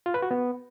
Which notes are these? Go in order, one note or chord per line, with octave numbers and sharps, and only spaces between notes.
F4
B4
F#4
B3